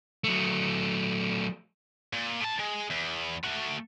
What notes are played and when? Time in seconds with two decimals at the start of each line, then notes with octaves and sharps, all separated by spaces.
0.24 F#3 A3
2.13 A#2
2.40 A2 A5
2.60 G#3
2.90 E2
3.44 A3 F#4